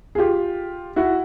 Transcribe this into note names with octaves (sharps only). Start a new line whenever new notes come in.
G#4
F4 G4
E4 F#4